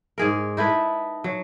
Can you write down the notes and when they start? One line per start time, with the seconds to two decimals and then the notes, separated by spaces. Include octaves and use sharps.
0.18 G#2 G#4 A#4
0.57 D#4 E4 A4 B4
1.24 F#3